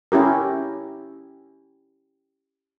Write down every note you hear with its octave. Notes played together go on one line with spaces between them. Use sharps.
C#4 E4 G4 A#4